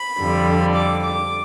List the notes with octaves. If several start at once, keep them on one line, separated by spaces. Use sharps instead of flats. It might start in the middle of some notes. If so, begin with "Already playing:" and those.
Already playing: B5
F2 D3 G3
D6
D6